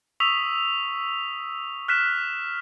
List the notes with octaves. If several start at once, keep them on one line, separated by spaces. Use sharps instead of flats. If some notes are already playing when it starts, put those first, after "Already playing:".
C#6 D#6 E6 B6 F7
F6 F#6 B6 E7